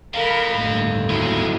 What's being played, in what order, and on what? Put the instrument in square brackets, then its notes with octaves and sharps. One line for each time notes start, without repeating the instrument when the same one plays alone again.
[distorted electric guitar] D3 [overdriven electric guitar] A4 F5 [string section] A#4 B5
[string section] G1 D#2 A2
[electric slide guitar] B2 F#3 E4 [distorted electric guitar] G#3 G#4